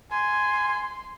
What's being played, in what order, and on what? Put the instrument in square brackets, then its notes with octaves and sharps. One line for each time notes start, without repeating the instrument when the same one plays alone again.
[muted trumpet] G#5 [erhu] C6